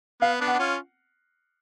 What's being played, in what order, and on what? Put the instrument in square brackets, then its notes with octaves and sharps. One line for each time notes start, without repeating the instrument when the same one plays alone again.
[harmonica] B3 [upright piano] F5
[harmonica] B3 D4
[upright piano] F#5
[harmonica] D4
C#4 F4